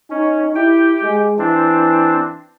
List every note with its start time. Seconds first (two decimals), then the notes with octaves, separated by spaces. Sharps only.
0.10 C#4 D#4
0.55 E4 G4 G5
1.03 G#3
1.39 E3 C4 D4